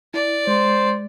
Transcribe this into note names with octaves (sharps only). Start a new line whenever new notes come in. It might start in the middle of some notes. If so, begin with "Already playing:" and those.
E4 D5
G#3 C5